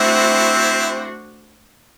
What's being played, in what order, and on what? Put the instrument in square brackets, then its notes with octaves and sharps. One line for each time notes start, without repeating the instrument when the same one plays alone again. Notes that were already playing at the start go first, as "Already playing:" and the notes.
Already playing: [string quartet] A3 D4 F#4 C5 [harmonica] C4 E4